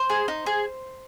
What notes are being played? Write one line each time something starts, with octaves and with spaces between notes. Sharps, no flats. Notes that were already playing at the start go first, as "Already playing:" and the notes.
Already playing: C5
G#4
D#4
G#4